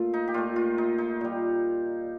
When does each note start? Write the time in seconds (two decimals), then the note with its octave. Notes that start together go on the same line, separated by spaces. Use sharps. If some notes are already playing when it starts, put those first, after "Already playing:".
Already playing: A#2 A3 F4
0.14 D#4
0.28 G4
0.34 A#2 A3 F4
0.56 F4
0.78 D#4
0.98 D#4
1.21 A#2 G3